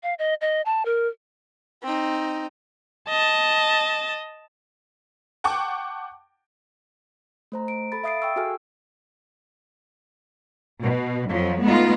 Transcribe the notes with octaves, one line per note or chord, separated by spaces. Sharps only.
F5
D#5
D#5
A5
A#4
C4 D#4
D#5 A5
F#5 G5 A5 C#6 D6
A3 C5 A#5
D7
A4 B5 A6
E5 F5 D#6 A6 C7 D7
G5 C#6 E6
F#4 G#4 A4 G#5 F6
B2
F2 F3 F#3
G#3 A3 B3 D#4 F4